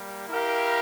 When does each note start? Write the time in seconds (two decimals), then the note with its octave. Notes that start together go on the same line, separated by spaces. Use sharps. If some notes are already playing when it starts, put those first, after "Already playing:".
Already playing: G3 A#3
0.29 E4 G4 A#4 F5